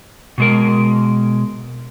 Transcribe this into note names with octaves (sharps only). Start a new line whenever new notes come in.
B2 G#3 A#4